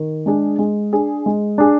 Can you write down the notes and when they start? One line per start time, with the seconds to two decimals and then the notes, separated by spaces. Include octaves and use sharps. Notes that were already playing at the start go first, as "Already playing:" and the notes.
Already playing: D#3
0.26 G#3 D4 G#4
0.59 G#3
0.93 D4 G#4
1.26 G#3
1.58 D4 G#4